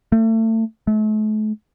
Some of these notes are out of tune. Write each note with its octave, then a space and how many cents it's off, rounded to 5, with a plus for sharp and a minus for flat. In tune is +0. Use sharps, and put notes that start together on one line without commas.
A3 +30
A3 -40